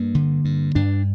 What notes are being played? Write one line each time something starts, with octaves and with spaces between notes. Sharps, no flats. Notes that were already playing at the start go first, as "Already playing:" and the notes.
Already playing: G2 A#3
D3
G2
G2 D4